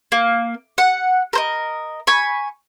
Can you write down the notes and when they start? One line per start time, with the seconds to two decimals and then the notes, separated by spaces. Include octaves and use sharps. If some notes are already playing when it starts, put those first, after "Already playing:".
0.12 A#3
0.78 F#5
1.33 A#4 C5 D#5
2.07 G#5 B5 C#6